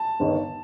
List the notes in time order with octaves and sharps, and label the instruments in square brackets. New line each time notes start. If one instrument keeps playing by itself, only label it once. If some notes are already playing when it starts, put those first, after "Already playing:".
Already playing: [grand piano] A5
[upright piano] G1 G2 D#3